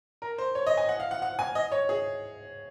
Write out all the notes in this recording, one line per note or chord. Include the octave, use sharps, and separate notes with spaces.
A#4
C5
C#5
D#5
G#5
F#5
F5
F#5
F#5
G#5
D#5
C#5
G#4